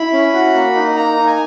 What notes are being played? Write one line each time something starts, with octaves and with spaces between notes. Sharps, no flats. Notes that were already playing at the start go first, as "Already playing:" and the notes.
Already playing: E4 B5
C#4
F#4
A#3
D#4
A#3 A#5
D#4
G#5